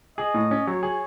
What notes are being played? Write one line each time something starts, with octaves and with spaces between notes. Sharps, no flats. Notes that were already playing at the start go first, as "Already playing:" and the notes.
G#4 D#5
A2
C#4
F#3 C#5
G#4